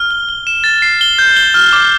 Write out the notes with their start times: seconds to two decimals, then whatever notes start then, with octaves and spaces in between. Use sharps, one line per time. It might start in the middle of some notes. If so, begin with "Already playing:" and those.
Already playing: F6
0.11 G7
0.29 G7
0.47 E7
0.64 A6
0.82 C7
1.01 G7
1.18 G6
1.37 G7
1.54 F6
1.73 D6